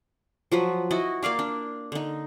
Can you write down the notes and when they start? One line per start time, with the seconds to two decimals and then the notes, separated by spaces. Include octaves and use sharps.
0.52 F3 F#3 B4
0.91 E4 F#4 D#5
1.23 A#3 D5 F5 D6
1.39 D4
1.92 D3 D#4